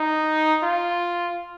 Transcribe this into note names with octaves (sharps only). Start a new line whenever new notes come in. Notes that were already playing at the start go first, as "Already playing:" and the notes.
Already playing: D#4
F4